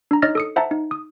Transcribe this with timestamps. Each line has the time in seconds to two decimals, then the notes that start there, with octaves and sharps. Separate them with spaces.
0.11 D4 A#5
0.22 D#4 C#5 D#5 F6 A6 A#6
0.35 A4 D#6 C#7
0.56 C5 E5 F#5 A5 A#5
0.71 D#4
0.91 D#6